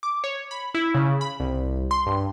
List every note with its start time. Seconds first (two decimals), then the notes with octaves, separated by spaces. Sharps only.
0.03 D6
0.24 C#5
0.51 B5
0.74 E4
0.95 C#3
1.21 B5
1.40 C2
1.91 C6
2.06 G2